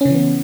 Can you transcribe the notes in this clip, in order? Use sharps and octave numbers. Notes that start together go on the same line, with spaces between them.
C#3 E3 B3 C#4